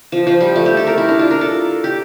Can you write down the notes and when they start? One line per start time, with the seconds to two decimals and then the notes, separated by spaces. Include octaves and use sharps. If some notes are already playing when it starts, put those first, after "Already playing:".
0.12 F3
0.27 F3
0.40 G3
0.56 A3
0.66 G4
0.77 A4
0.87 A#4
0.98 E4
1.09 D4
1.19 F4
1.31 A#4
1.41 A4
1.84 G4